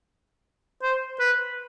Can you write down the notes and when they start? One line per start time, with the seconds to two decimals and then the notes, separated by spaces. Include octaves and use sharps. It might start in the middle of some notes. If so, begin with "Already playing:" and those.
0.83 C5
1.20 B4